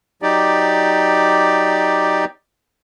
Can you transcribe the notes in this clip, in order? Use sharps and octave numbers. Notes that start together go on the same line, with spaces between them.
F#3 D#4 G4 D5